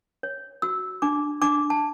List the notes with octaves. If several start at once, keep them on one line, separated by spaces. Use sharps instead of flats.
C#5
F#4 E6
D4 D6
D4 D6
A5